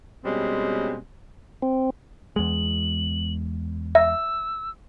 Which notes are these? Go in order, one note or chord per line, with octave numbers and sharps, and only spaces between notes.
B2 G3 G#3 C4 C#4
C4
E2 G#3 F#7
E5 E6